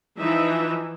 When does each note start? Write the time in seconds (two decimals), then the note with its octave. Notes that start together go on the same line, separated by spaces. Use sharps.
0.19 E3 F3 D#4 E5